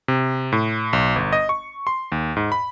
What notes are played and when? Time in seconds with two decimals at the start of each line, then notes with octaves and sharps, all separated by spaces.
0.08 C3
0.52 A2
0.93 B1
1.16 G1
1.33 D#5
1.49 C#6
1.87 C6
2.12 D#2
2.37 G#2
2.52 B5